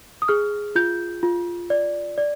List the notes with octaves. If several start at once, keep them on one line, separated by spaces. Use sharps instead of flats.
D#6
G#4 F6
F4 G6
F4
D5
D5